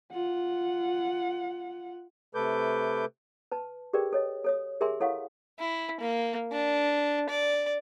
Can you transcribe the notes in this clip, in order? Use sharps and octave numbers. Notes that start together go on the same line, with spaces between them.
F4 F#5
C3 A3 A4 B4 D6 G6
B4 A5
G4 G#4 A#4 B4 D5 G5
A4 C#5 D#5
A4 C#5 D#6
G4 G#4 A#4 E5 G#5 C6
E4 A4 C#5 F5 F#5 C#6
E4
A#3
D4
D5